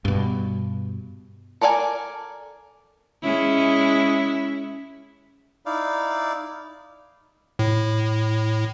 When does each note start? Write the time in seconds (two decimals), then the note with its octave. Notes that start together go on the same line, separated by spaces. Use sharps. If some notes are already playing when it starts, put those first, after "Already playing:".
0.05 G2 B2
1.61 A4 A#4 D5 F5 G#5
3.23 G#3 C#4 E4
5.66 D#4 E4 D5 F5
7.59 A2